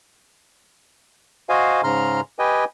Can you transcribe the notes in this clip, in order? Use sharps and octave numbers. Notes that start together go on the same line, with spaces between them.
F#4 C5 D#5 F5 G#5
G#2 C#3 A#5 C6 F6
G4 B4 D#5 G5 G#5